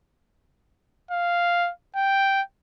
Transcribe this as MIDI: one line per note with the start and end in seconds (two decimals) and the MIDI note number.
1.11 1.70 77
1.96 2.42 79